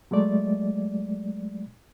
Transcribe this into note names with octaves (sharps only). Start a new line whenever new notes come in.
F#3 G#3 A3 D5